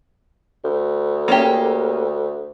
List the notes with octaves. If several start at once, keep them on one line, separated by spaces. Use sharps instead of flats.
D2
A#3 C#4 G4